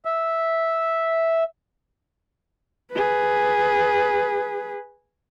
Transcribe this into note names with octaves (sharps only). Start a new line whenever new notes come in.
E5
G#4 B4